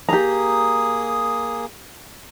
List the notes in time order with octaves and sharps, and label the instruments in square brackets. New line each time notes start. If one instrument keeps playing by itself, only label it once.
[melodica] A#3 G#4 D#6 [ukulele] G4 A#5